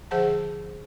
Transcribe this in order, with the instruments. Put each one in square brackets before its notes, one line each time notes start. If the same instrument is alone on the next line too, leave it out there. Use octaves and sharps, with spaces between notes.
[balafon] D3 F3 G#4 C5 F#5 A5